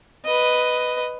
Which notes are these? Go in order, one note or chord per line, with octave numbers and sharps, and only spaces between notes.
B4 D#5